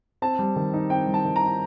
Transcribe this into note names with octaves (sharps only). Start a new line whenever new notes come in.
C4 A5
G3
D#3
D#4
C4 G5
G3
A5
D#3
A#5
D#4